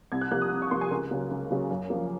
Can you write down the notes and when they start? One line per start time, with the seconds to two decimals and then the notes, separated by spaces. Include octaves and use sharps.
0.12 C2 G#6
0.21 F#6
0.32 C3 F3 A#3 F#6
0.42 D#6
0.52 C2
0.62 C#6
0.71 C3 F3 A#3 C6
0.81 G#5
0.91 C#2 A#4
1.11 C#3 F#3 A#3
1.31 C#2
1.51 C#3 F#3 A#3
1.71 F#2
1.90 F3 A#3